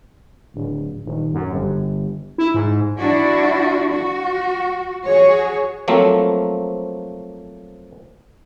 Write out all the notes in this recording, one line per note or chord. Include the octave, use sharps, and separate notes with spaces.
D1
D#1
F#2
G1
E4
G#2
D4 E4 F#4 D5
F#4
F#4 G#4 C#5
F3 F#3 A3 A#3 C4